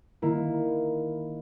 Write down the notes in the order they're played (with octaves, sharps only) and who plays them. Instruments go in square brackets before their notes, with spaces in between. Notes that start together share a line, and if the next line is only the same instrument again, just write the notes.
[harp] D#3 A#3 E4